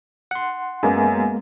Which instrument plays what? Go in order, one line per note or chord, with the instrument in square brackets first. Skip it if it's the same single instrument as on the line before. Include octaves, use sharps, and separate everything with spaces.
[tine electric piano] F#5 C6
[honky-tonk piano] F#2 [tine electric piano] G#3 A#3 B3